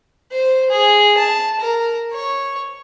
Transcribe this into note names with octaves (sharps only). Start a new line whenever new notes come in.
C5
G#4
A5
A#4
C#5